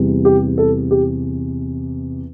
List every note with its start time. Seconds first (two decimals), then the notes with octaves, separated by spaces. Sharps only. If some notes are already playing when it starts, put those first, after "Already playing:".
Already playing: E2 C3 G3
0.25 G4
0.58 A4
0.91 G4